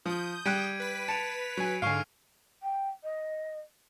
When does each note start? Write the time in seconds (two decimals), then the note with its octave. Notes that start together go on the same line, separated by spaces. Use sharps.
0.06 F3 D#6 G6
0.45 G3 G5 F#6 G#6 D7 D#7
0.80 B4 B6
1.08 A5 C#7 D7 F7
1.57 F#3 G#5
1.82 G#2 D3 F5 G#5 C#6 F6 C7
2.62 G5
3.03 D#5